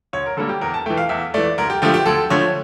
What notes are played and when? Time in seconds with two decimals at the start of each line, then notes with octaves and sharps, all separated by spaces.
0.13 D2 C#5
0.26 A#4
0.37 D3 G3 A#3 A4
0.49 G4
0.61 E2 A#4
0.74 A5
0.86 A3 G5
0.90 E3
0.97 F5
1.09 E2 E5
1.34 E3 A3 D5
1.58 D2 A#4
1.70 G4
1.82 D3 F3 A3 G4
1.94 G4
2.06 D2 A4
2.30 D3 F3 A3 C#5